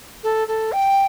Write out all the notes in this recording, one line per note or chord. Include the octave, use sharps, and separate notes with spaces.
A4
A4
G5